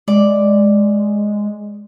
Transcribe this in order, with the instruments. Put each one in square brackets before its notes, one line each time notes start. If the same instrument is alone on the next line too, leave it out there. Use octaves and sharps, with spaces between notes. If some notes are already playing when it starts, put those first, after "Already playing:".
[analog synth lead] G#3 [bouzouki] D5